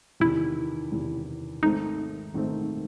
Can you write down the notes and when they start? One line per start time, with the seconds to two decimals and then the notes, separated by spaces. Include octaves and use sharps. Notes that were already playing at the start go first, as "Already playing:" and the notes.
0.20 E2 C3 D#3 E4
0.92 E2 C3 D#3
1.63 G#1 G#2 D#3 A3 C4 D#4
2.34 G#1 G#2 D#3 A3 C4